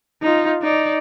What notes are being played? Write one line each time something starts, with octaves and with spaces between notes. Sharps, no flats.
D#4 F4
D#4 D5